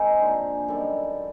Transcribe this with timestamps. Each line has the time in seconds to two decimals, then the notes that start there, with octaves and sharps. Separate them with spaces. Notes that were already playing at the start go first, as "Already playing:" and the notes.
Already playing: D#3 G#3 C4 D#4 G#4
0.19 D3 F3 A#3
0.68 F#2 D#3 G3 A4